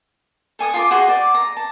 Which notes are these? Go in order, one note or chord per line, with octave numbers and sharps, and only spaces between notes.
A4 G#5 D6 D#6
F4 A5 D6
F#4 G#4 C5 C6
D5
A#5
A5